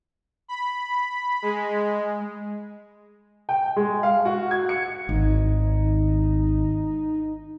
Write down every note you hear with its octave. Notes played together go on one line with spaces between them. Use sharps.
B5
G#3
G5
G#3
F5
F#4
G#6
C#7
G#1 D#4